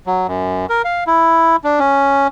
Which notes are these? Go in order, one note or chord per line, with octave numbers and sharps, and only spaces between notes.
F#3
F#2
A#4
F5
E4
D4
C#4